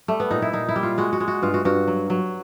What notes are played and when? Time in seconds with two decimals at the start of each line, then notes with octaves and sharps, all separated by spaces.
0.08 G3 A3
0.20 B3
0.31 A#2 D#4
0.42 E4
0.53 A#2 D#4
0.69 E4
0.76 G3
0.83 F4
0.98 G#3 F#4
1.13 F#4
1.20 G#3
1.28 F#4
1.42 G2 F4
1.54 F#4
1.65 G2 F#4
1.88 F#3
2.10 F#3